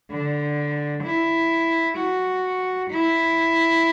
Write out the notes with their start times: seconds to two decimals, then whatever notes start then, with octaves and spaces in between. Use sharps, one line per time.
0.11 D3
1.04 E4
1.98 F#4
2.91 E4